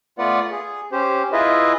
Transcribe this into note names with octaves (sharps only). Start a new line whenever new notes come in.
A3 B3 F4 B4 D5 F#5
G#4
C#4 G4 C5
E4 F4 G#4 B4 D#5 E5